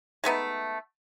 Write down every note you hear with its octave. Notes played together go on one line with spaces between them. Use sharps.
G#3 A3 B3 D#4